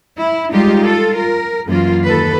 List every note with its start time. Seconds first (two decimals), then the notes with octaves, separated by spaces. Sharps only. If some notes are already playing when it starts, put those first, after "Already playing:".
0.19 E4
0.52 G3 G#3 D#4 F4 G4
0.84 F4 A4
1.16 A#4
1.66 F#2 E3 A#3 F4
2.05 D#2 A4 B4